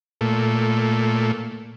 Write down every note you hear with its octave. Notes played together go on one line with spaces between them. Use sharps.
A#2 A3